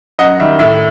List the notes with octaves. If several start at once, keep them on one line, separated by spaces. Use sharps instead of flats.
F#2 D#5 F#5
D#3 G3 E5
A2 E5